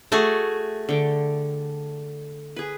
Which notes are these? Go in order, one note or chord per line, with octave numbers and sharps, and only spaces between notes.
A3 F#4 G#4 A4
D3 G5
G#4 B4